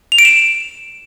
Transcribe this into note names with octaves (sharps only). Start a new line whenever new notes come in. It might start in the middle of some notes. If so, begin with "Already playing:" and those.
F7
D7
E7